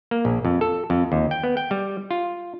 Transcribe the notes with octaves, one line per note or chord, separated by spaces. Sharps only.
A#3
A#1
F2
A4
F2
D#2
G5
B3
G5
G3
F4